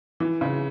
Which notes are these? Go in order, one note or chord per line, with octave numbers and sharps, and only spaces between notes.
E3
C#3